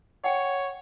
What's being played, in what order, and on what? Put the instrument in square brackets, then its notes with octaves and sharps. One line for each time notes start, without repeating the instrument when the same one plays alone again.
[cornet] C#5 [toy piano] F#5 G5